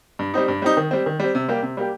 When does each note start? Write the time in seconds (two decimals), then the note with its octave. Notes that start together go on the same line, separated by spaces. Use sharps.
0.19 G2
0.34 G3 C4 D#4
0.48 G2
0.62 G3 C4 D#4
0.77 D#3
0.91 G3 C4
1.06 D#3
1.20 G3 C4
1.35 C3
1.48 G3 A#3 G4
1.63 C3
1.77 G3 A#3 G4